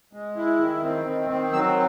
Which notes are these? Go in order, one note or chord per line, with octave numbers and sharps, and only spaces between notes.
G#3
E4
D#3
C4
D#3
C4
F#3 E6